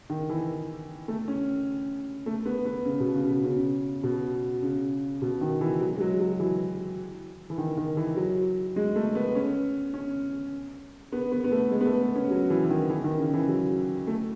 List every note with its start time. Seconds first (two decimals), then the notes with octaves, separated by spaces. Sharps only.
0.10 D#3
0.29 E3
1.08 A3
1.28 C#4
2.26 A3
2.46 B3
2.65 B3
2.85 C#3
3.00 B2
3.15 C#3
3.30 B2
3.44 C#3
4.03 B2
4.63 C#3
5.22 B2
5.41 D#3
5.61 E3
5.81 F#3
5.96 G#3
6.00 F#3
6.20 F#3
6.40 E3
7.50 E3
7.58 D#3
7.77 D#3
7.97 E3
8.16 F#3
8.76 G#3
8.96 A3
9.15 B3
9.35 C#4
9.94 C#4
11.12 B3
11.32 B3
11.44 B3
11.52 A3
11.71 G#3
11.81 B3
11.86 A3
12.01 B3
12.16 C#4
12.30 F#3
12.50 E3
12.64 E3
12.69 D#3
12.90 E3
13.04 D#3
13.19 C#3
13.34 E3
13.48 F#3
14.07 A3